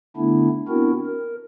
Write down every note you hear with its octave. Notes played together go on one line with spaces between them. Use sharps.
D3 A3 B3 D4 E4
B3 C4 D4 E4 F#4 A#4
A#4